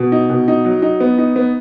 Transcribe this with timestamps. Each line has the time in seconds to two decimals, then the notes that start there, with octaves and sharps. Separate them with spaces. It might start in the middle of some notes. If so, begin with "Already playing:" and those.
Already playing: B2
0.12 D#4
0.30 B2
0.48 D#4
0.65 F#3
0.82 D#4
1.00 B3
1.18 D#4
1.36 B3